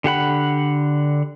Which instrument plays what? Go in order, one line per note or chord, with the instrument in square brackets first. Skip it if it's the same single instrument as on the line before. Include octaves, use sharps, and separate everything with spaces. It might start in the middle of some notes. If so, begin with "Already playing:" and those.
[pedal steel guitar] D3 G4 F#5 B5